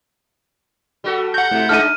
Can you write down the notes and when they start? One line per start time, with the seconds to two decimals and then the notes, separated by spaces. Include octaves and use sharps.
1.04 G3 F#4 A4
1.34 F#5 A#5 C#6 G6
1.51 C3 A3 E4
1.69 G#3 D4 D#4 F6 D#7